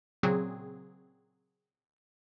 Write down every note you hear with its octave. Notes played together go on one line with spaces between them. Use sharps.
A#2 C#3 F#3 C4 G#4